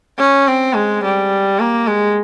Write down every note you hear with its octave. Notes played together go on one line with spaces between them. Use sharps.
C#4
C4
G#3
G3
A#3
G#3